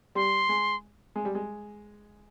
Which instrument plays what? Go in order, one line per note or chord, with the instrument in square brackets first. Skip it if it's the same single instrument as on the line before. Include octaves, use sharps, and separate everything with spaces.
[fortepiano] G3 [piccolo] C6
[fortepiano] G#3
G#3
G3
G#3